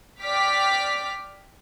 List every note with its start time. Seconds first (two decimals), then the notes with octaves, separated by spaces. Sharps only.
0.21 D5 G5 D6 F6 B6